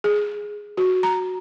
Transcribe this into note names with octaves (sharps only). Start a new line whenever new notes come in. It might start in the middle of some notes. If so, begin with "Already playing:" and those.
G#4
F#4
A#5